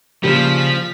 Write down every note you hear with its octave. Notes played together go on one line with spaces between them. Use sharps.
A#2 C#3 F3 G3 F5 B6